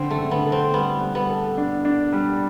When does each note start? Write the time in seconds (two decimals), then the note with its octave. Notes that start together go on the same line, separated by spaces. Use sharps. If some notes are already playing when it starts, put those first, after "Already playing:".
Already playing: D3 C4
0.11 A3
0.18 D3
0.31 B3
0.46 A4
0.52 C4
0.74 G3 B3
1.01 G3
1.15 B3
1.30 A4
1.58 D4
1.85 D4
2.13 G3